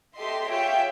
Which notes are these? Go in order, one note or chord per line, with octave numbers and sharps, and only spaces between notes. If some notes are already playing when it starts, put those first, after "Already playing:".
G4 A4 D#5 E5 C6
F4 G4 G#4 C#5 E5 G5